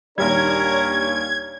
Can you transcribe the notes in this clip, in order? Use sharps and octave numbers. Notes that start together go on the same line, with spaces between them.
D#2 A#2 G3 D4 G4 A#4 C#5 G#6